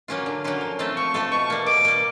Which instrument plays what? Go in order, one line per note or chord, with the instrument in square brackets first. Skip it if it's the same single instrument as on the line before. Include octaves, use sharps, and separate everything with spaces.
[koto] F#3 A#3 C#4 F4
D3
F#3 A#3 C#4 F4
F3
A3 C4 F4 A4
[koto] F3 [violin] C#6
[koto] A3 C4 F4 A4
[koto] B2 [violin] C#6
[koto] G3 A#3
[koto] B2 [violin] D6
[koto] G3 A#3